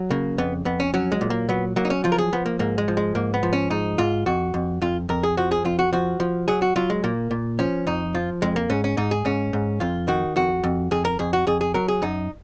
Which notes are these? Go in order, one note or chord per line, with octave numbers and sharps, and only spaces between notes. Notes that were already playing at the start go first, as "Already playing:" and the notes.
Already playing: F#3
C#3 A#3
F2 B3
F2 B3
C#4
F#3 C#4
G#3
A#2
A#3
F#3 B3
F#3 A#3
D#4
C#4
F3 F4
A#4
G#4
F3 B3
A#3
G#2 A#3
G#3
F3
G#3
G#2 A#3
B3
F3
C#4
G#2 D#4
G#2 F4
F2 F#4
F2
F2 F4
F2 A#4
G#4
F3 F#4
G#4
F2 F4
F#4
F3 F#4
F3
F#3 G#4
F#4
F#3 F4
G#3
A#2 A#3
A#2
F3 C#4
F2 D#4
F3 F4
F2 G#3
A#3
G#2 C#4
C#4
G#2 D#4
G#4
G#2 C#4
G#2
F2 F4
D#3 F#4
F2 F#4
F2
F2 G#4
A#4
F2 G#4
F#4
F2 G#4
G#4
F#3 A#4
G#4
F#2 D#4